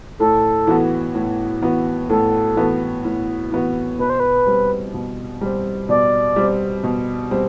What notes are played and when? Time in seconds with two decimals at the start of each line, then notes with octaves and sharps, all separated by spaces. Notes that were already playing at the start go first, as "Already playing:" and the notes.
0.19 A2 A4
0.67 E3 B3 F#4
1.15 A2
1.62 E3 B3 F#4
2.09 A2 A4
2.57 E3 B3 F#4
3.05 A2
3.51 E3 B3 F#4
3.99 B2 B4
4.10 C5
4.20 B4
4.47 G3 C4
4.94 B2
5.41 G3 C4
5.89 B2 D5
6.36 G3 C4
6.84 B2
7.31 G3 C4